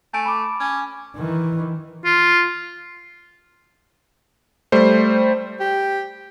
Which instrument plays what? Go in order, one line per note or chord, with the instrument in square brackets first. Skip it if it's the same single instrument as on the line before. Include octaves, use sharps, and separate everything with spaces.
[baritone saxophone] A3 [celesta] G#5 D7
[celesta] B5 D6
[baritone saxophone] C#4
[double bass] D#3 E3
[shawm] F4
[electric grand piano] G3 A3 C5
[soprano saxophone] G4